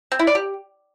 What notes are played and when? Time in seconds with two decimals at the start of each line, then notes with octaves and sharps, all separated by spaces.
0.12 C4
0.19 E4
0.27 D5
0.35 G4